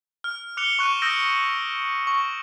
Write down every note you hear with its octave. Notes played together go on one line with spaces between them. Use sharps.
F6
D6 F#6 C#7 F7 G7
C#6 F#6 D7 D#7
D#6 E6 G6 A#6 D7
C#6